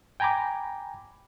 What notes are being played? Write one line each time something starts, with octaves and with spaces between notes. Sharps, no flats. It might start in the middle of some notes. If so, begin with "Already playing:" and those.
G5 G#5 A#5 B5 D6